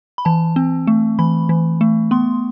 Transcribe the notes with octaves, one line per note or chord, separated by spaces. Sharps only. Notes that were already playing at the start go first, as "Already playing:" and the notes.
B5
E3 A5
C4
A3
E3 B5
E3
A3
B3 C6